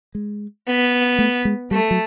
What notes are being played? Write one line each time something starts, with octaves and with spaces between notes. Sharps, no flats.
G#3
B3
A3
G#3
G3 A3
F#3